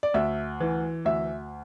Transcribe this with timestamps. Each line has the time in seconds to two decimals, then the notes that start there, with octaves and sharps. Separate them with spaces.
0.03 D5
0.14 D2 E5
0.60 E3
1.05 D2 E5